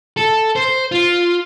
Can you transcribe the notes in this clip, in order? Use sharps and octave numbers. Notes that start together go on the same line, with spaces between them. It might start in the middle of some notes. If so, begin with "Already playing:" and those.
A4
C5
F4